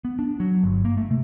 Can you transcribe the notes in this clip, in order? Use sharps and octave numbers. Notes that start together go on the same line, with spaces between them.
B3
D4
F#3
G1
A#3
A3
C3